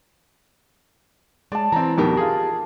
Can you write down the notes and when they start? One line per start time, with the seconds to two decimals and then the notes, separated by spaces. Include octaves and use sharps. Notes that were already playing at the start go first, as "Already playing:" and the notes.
1.52 G#3 D5 A5
1.72 E3 C4 A#5
1.98 F2 B2 D#3 D#4 G4 A#4
2.17 F4 G#4